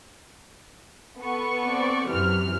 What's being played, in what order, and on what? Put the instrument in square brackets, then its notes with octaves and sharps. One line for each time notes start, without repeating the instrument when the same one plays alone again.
[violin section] B3 A4 C#6
[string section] C4 D5
[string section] F#2 C3 E3 [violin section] F6